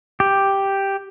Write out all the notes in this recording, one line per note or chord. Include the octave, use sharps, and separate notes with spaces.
G4